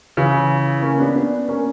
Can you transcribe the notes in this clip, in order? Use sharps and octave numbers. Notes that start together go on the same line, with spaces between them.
C#3 E3
A#3 C#4
B3 D4
B3 D4
A#3 C#4